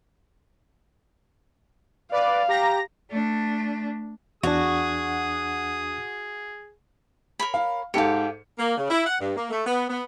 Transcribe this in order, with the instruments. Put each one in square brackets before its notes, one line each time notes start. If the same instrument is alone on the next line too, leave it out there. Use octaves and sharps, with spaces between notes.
[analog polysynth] B4 D5 [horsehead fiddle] F5
[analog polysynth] G4 A#5 A#6
[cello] A3 D4
[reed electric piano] E2 D4 [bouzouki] F#4 [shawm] G#4 [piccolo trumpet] D#6
[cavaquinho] A#4 C#5 B5
[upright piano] F5
[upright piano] G#2 A4 C#7 [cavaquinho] G4 F5
[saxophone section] A#3
C#3
E4
F#5
G2
A#3
A3
B3
B3